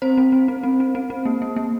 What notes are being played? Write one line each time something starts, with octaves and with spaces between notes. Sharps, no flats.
C4 C5
C4
C4
C4
C4
C4
C4
C4
A#3
A#3
A#3